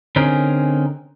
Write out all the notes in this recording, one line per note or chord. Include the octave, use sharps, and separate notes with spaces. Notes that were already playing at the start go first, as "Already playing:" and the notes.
D3 C4 C#4 D#4 G#4 A#4